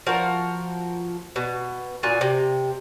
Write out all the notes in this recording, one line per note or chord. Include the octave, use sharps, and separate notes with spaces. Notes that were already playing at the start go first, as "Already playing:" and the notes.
F3 F#4 A#4
B2
A#2 F4 F#4 G#5
C3